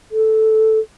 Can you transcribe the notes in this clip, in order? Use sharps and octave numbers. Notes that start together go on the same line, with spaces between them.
A4